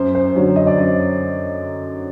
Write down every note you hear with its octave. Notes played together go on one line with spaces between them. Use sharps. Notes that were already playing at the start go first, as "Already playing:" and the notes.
Already playing: F#2 C5
C5
D3 F#3 C#5
D#5
D5
F#2 D#5